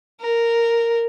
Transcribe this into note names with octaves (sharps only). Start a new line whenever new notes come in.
A#4